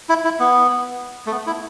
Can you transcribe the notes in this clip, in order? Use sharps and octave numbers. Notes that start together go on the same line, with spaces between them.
E4
E4
B3
A3
B3
E4